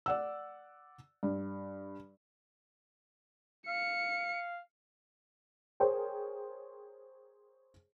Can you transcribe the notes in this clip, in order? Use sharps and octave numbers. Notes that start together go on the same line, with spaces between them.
D5 F#5 E6
G2
F5 C#7
G#4 A#4 C5 C#5 G5